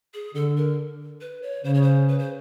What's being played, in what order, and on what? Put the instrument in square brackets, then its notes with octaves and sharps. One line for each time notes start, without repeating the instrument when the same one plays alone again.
[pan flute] G#4
[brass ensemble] D3 [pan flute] A4
[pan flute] A#4
B4
C#5
[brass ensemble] C#3 [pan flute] C5
[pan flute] C#5
C5
B4
C5